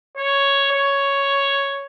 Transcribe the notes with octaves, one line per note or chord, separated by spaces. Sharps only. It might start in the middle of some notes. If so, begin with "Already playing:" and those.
C#5
C#5